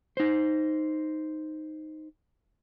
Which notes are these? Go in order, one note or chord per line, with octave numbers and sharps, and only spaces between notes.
D#4 C5